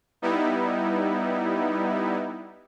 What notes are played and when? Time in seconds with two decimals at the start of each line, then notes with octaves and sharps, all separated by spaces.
0.22 G3 B3 D#4 E4